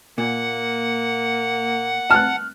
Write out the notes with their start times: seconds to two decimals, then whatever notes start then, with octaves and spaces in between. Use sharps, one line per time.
0.18 A#2 A#3 F#5
2.11 A5 F6 F#6